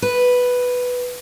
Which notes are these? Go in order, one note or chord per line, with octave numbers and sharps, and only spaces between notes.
B4